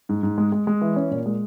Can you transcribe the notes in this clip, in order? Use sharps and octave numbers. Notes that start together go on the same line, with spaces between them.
G#2
G#2
G#3
G#3
G#3
E3
C#4
A#2
G#3